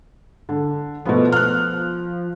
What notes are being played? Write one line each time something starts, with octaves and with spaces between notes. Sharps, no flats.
D3
B2 F3 A3 B3
F6 F#6